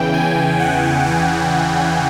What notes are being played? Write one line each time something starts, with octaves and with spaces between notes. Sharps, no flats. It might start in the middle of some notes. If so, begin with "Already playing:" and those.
Already playing: E2 C#3 E3 G5
G#5
F#5
G#5